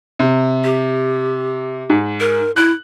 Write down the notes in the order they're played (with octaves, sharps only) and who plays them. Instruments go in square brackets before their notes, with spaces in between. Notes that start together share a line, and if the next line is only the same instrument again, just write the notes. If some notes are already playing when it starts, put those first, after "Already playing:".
[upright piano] C3
[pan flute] G4
[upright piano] G#2
[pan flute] A#4
[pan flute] E4 [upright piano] F#6